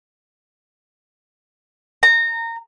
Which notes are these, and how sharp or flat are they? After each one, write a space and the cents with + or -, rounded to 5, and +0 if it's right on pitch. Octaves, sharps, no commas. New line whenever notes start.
A#5 -20